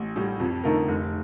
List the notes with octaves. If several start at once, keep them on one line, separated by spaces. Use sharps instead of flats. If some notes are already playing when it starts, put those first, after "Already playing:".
Already playing: A1
A2 G3
F2
D3 A3 D#4 A#4
F1